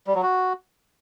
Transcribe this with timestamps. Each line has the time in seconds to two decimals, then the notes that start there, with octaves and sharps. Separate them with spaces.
0.07 G3
0.15 F#3
0.23 F#4